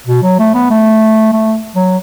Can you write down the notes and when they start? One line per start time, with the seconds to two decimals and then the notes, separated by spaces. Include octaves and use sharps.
0.07 B2
0.23 F#3
0.39 A3
0.54 B3
0.71 A3
1.33 A3
1.75 F#3